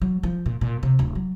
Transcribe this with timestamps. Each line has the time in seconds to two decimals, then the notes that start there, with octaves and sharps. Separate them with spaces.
0.02 F#3
0.23 F3
0.46 A#2
0.61 A#2
0.83 C3
0.99 D1
1.15 F#3